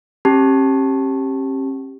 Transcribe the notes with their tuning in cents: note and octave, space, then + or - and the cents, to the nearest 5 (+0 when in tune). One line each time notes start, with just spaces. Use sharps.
C#4 -45 G4 +0 A5 +0